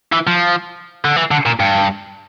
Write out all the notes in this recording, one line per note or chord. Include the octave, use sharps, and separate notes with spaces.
E3
F3
D3
E3
D3
A#2
G2